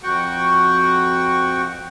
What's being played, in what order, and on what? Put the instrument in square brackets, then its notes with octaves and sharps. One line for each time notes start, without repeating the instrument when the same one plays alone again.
[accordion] F2 F#4 F#5 G5 C#6